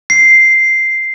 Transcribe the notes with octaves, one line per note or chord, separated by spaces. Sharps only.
C7